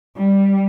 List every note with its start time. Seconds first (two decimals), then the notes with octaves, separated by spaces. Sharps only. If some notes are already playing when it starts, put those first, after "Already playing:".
0.17 G3